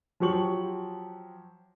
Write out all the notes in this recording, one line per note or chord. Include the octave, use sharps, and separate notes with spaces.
F3 F#3 G4 C#6 F#7